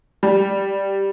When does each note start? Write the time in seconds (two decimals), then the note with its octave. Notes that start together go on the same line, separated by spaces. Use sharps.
0.23 G3